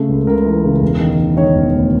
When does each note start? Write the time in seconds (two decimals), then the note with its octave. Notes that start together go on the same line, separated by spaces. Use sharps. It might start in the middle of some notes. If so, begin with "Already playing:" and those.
Already playing: C#3 A3
0.09 C#2
0.27 C#2 A#4
0.46 E3
0.64 C#3
0.82 E1
1.01 D#3
1.19 D#3
1.37 D#3 C#5
1.55 E1
1.74 D2